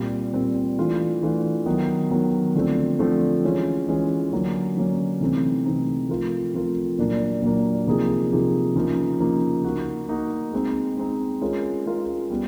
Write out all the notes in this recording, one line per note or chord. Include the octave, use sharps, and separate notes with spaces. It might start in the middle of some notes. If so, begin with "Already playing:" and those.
Already playing: A#2 G3 C4 F4
A#2 G3 C4 F4
E3 A3 D4 F4
E3 A3 D4 F4
D#3 F#3 B3
D#3 F#3 B3
D3 F3 A3 C4
D3 F3 A3 C4
E3 G#3 C#4 F4
E3 G#3 C#4 F4
D3 F#3 A#3 C#4
D3 F#3 A#3 C#4
C3 E3 A3 C4 D#4
C3 E3 A3 C4 D#4
F3 A3 C4 F4 A#4
F3 A3 C4 F4 A#4
A#2 F#3 A#3 D4
A#2 F#3 A#3 D4
C3 F3 A#3 D#4 G#4
C3 F3 A#3 D#4 G#4
C#3 F3 A#3 D#4
C#3 F3 A#3 D#4
A#3 D#4 F#4
A#3 D#4 F#4
G#3 C4 D#4
G#3 C4 D#4
G#3 C#4 F4 A#4
G#3 C#4 F4 A#4
G3 B3